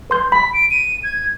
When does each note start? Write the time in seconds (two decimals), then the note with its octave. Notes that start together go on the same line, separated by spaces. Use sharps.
0.10 B4 C6 G6
0.32 B5 B6
0.53 D7
0.71 D#7
1.04 G#6